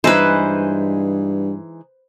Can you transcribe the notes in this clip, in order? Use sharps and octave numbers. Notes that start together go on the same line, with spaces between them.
G2 E3 G#3 D#4 B4 C5